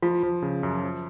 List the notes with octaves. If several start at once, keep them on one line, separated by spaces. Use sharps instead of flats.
F3 F4
F3
C#3
F#2
F3